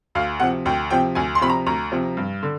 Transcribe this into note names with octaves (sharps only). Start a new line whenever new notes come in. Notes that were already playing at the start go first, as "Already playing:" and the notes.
D2 F5
C3 F3 F#5
D2 G5
C3 F3 G5
D2 G#5
C6
C3 F3 B5
A#5
D2 A#5
C3 F3
G2
D3